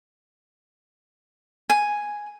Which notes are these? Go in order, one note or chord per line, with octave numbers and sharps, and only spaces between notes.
G#5